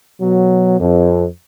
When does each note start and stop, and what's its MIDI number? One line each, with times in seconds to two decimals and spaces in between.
0.21 0.77 47
0.21 0.77 54
0.79 1.25 41